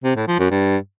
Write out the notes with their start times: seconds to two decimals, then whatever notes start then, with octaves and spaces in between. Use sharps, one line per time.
0.04 C3
0.16 A2
0.27 F3
0.39 F#2
0.51 G2